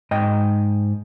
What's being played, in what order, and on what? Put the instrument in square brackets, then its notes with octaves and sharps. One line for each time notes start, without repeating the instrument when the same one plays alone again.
[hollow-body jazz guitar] G#2 D#5 G5